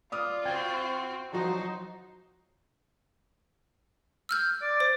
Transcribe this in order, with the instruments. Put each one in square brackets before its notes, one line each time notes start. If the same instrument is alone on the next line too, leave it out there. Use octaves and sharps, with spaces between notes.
[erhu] F4 [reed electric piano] D5 [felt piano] D6 D#6 F6
[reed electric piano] C#2 G5 G#6 [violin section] C4 F#4
[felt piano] F3 F#3 F#4 [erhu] D#4 [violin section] C5
[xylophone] E6 F6 G6
[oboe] D5
[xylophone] C5